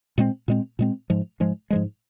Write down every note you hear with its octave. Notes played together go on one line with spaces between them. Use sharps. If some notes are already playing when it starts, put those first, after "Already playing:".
A#2 G#3 C4
A#2 G#3 C4
A#2 G#3 C4
G#2 F3 G#3
G#2 F3 G#3
G#2 F3 G#3